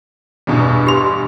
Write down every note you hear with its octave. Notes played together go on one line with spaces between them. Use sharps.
E2 G2 B2
G4 C6